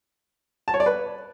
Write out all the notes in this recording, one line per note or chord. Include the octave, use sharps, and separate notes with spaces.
A5
C#5
D5
B4